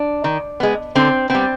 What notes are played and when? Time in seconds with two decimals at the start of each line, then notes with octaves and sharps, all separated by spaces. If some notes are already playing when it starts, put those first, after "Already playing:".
Already playing: D4
0.24 D#3
0.60 G#3 B3
0.95 D3 C4
1.30 G3 B3 C4